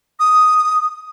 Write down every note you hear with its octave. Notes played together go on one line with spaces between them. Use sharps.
D#6